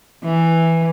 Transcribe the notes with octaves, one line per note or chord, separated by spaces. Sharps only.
E3